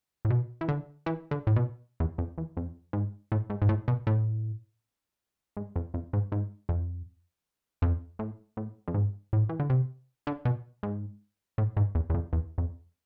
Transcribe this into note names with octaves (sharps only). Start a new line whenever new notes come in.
A2
B2
E3
D3
E3
D3
A2
B2
E2
F2
E2
F2
G#2
A2
G#2
G#2
A2
B2
A2
G#2
F2
F2
G#2
G#2
F2
F2
A2
A2
F2
G#2
A2
E3
D3
C3
D3
B2
G#2
A2
G#2
E2
E2
F2
E2
F2